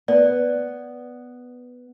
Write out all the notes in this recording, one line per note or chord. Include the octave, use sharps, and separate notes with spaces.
B3 D5